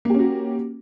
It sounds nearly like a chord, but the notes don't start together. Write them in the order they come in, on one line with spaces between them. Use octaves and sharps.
A#3 G4 C#4 F#4